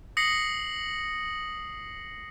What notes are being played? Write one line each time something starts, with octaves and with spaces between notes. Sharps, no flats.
D#6 A#6 C7 C#7 F#7